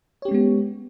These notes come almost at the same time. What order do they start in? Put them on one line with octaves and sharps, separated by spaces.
C#5 G4 C#4 G#3 B3